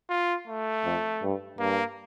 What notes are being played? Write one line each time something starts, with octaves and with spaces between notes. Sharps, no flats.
F4
A3
F2
G2
G2 A#3